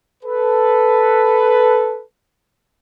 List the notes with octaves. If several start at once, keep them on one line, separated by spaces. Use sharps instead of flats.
A4 B4